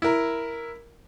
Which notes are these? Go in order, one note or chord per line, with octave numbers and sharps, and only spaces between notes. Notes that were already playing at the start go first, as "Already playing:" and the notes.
E4 A#4